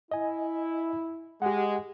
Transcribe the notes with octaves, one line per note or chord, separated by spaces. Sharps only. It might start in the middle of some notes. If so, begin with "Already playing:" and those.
E4 D#5 G#5
G#3 G4 F#5